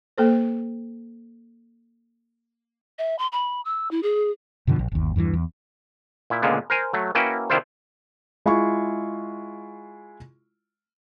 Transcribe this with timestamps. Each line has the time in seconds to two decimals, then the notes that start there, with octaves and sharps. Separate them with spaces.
0.18 A#3 A4 C5
2.99 E5
3.19 C6
3.32 B5
3.65 E6
3.91 E4
4.03 G#4
4.67 F#2 B2 D3 F3
4.79 A#1
4.92 G1 D#2
5.16 E2 G2 D3 E3
5.33 E2
6.30 A#2 E4
6.42 C#2 A#2 D3 G#3 A#3 B3
6.70 A#4 C5 G#5
6.93 F#3 A3
7.15 A#3 C#4 E4 F#4 B4 G5
7.50 C3 D#3 D4 E4 F4 C5
8.46 G#3 E4 F4 C#6